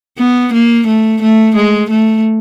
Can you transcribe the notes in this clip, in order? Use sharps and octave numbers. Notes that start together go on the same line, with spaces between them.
B3
A#3
A3
A3
G#3
A3